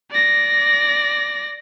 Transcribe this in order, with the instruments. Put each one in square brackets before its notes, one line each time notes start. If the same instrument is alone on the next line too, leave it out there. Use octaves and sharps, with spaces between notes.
[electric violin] D5 A#6